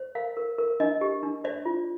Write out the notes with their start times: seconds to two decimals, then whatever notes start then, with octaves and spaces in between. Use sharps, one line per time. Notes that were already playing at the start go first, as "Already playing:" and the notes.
Already playing: C5
0.15 A#4 F5
0.37 A#4
0.58 A#4
0.80 D4 D#5
1.01 G4
1.23 D4
1.44 C5 D5
1.65 F4